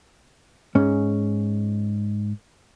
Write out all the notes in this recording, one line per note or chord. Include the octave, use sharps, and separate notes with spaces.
G#2 C#4